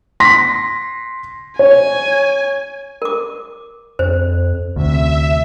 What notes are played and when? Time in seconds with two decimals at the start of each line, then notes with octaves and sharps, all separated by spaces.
0.20 C6 A#6 B6
1.59 C#5 G#5
3.02 A#4 D6
3.99 F2 C5
4.76 D2 C3 E5